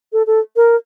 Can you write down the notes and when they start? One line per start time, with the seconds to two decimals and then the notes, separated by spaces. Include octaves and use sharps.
0.13 A4
0.27 A4
0.56 A#4